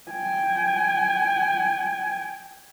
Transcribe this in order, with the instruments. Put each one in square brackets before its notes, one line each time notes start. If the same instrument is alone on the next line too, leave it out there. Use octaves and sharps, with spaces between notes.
[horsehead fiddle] G5 G#5